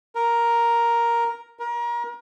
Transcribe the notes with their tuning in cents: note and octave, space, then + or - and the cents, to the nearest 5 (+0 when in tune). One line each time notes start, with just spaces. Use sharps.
A#4 +5
A#4 +30